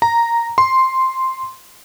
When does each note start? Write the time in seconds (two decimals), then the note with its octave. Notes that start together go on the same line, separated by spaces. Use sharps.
0.02 A#5
0.58 C6